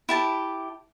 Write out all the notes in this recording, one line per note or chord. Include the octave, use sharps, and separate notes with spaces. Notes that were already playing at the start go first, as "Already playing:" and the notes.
E4 G4 A5